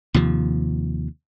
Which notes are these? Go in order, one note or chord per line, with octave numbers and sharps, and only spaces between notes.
D#2 C3 F3